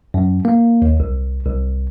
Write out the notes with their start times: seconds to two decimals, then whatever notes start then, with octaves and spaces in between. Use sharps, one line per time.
0.14 F#2
0.45 A#3
0.82 D#2
1.00 C2
1.45 C2